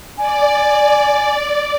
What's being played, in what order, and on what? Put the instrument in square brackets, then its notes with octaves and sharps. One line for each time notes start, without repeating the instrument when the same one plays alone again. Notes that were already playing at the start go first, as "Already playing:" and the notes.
[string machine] D5 [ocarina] G#5